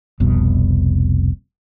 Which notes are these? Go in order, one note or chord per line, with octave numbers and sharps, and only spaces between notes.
F1 C2 B2